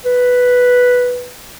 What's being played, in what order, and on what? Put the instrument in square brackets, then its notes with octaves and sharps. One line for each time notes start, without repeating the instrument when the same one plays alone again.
[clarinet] B4